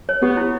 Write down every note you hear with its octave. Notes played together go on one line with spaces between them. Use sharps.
C#5
B3 G4
E4